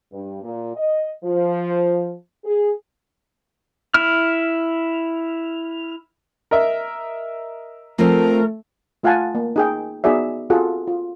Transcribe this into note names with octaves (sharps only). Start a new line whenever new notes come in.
G2
A#2
D#5
F3
G#4
E4 F6
A#4 D#5 E5
F3 A3 C4 A#4
A3 F4 F5 F#5 G#5 A5
A#3
D#4 G#4 G5
B3 D#4 F#4 G#4 D5 E5
C4 F4 F#4 G#4 A4 F#5
F4